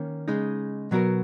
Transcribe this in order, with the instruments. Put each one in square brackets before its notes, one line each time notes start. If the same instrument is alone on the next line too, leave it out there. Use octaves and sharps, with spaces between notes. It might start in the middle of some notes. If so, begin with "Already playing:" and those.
Already playing: [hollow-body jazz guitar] D#3 A#3 C#4
C#3 G#3 D#4
B2 F#3 B3 F#4 A#4